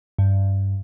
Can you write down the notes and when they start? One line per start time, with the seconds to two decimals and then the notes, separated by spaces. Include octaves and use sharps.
0.18 G2